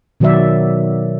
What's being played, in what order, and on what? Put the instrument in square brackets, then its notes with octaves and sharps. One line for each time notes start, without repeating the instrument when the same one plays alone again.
[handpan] B2 D#3 F#3 F#4 D5 E5